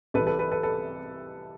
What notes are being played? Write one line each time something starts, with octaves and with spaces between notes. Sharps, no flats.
C2 C3 E3 A4 B4
A4 B4
A4 B4
A4 B4
A4 B4